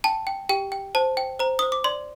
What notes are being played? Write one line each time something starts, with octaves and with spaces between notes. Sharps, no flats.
G5 A5
G5
G4 G5
G5
C5 A5
G5
C5 A#5
C5 D#6
D6
D5 C6